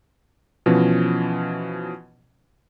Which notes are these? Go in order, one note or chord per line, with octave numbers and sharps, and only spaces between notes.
B2 E3 F3 C#4